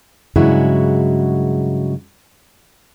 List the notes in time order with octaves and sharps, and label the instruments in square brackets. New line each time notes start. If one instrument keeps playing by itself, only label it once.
[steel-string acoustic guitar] G2 C#3 F#3 G#3 E4 F#4